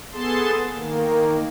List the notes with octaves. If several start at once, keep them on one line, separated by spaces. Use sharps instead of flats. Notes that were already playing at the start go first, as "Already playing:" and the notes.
B3 G#4 A4 A5 C6
D#3 A#3